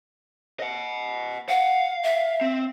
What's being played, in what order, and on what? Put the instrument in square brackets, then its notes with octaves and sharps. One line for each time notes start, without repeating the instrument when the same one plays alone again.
[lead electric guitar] D#5 F#5
[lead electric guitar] F5 [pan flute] F#5
[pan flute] E5
[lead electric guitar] C4